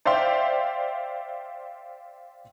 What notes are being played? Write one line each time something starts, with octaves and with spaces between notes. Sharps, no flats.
C5 D5 E5 F5 G5 C6